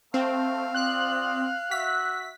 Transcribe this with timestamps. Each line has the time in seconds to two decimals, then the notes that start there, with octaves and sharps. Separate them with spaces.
0.14 A3 C4 F5
0.74 F4 D5 D#6 F#6
1.71 F#4 E5 B6